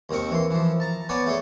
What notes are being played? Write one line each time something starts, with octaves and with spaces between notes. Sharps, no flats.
D#2 D#3 C4 C#6
E3 C6
E3 F3
A5 A#5
B3 B4 C#5 D5 G#5 A5
A3 G#4 C#5